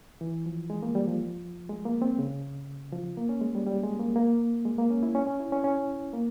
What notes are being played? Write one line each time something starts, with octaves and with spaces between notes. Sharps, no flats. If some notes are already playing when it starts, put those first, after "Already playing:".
E3
F3
G#3
A#3
G3
F3
G#3
A#3
C4
C#3
F3
A#3
C#4
G#3
G3
G3
G#3
A#3
A#3
G#3
A#3
C#4
E4
C#4
C#4
E4
C#4
C#4
A#3